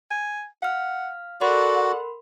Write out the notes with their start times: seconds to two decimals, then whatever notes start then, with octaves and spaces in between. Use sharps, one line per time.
0.11 G#5
0.62 F5 F#5 F6
1.41 F#4 A4 A#4 D5 F#5 B5 C6